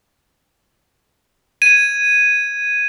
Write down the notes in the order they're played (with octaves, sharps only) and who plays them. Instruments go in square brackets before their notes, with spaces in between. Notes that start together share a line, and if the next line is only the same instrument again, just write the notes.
[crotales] G#6 D#7